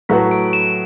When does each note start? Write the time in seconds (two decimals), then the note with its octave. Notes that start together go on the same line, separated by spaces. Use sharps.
0.09 A2 F#3 A3 F#4 B4 B6
0.31 D7
0.53 E7